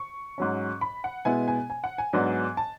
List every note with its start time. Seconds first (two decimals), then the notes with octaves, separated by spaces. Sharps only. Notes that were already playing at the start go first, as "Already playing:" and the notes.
Already playing: C#6
0.38 G#2 F#3 C#4
0.81 B5
1.04 F#5
1.25 B2 G#3 B3 E4 G#5
1.48 G#5
1.70 G#5
1.84 F#5
1.98 G#5
2.13 G#2 F#3 B3 D4
2.57 A5